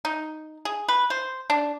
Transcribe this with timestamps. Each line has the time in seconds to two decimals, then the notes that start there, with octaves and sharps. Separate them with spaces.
0.05 D#4
0.65 G#4
0.88 B4
1.10 C5
1.50 D4